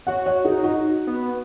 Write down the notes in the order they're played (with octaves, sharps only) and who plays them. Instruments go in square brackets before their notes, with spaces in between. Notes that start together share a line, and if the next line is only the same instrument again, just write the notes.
[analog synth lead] F#4 [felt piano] C#5 F#5
[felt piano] C#5 F#5
[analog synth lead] D#4 [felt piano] G#4
[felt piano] F#4
[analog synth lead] B3